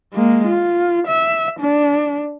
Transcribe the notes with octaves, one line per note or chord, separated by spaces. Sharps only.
G#3 A#3
F4
E5
D4